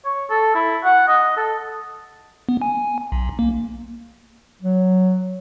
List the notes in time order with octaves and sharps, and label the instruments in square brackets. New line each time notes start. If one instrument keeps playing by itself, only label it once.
[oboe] C#5
A4
E4
F#5
D#5
A4
[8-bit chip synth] B3
G#5
B1
A#3
[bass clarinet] F#3